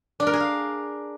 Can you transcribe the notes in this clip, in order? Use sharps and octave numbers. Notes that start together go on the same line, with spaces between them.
D4
A#4
G#4
F5